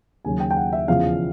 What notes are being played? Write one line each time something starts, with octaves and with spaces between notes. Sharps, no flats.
D#2 C#3 F#3 G#5
G5
G5
F#5
E5
E1 E2 C#3 F3 F5